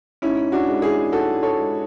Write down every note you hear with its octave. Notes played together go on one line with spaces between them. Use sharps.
G#2 C#4 E4
D4 F#4
G#3
E4 G#4
G#2 F#4 A4
A4 C#5
G#3